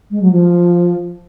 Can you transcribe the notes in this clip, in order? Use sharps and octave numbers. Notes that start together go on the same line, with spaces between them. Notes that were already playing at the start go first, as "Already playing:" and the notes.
G#3
F#3
F3